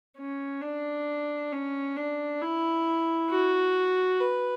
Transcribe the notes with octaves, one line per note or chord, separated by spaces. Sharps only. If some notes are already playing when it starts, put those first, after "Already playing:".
C#4
D4
C#4
D4
E4
F#4
B4